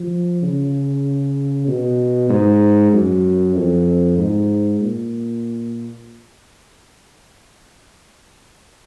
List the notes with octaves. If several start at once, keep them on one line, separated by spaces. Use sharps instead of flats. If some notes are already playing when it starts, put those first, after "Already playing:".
Already playing: F3
C#3
B2
G#2
F#2
F2
G#2
A#2